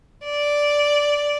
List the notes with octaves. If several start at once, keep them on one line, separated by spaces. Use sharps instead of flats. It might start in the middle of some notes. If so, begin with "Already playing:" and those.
D5